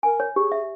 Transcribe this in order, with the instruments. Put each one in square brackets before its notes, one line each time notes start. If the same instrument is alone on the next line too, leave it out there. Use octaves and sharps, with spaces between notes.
[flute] A#4 [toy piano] G#5
[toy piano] C#5
[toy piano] G4 [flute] G#4
[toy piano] E5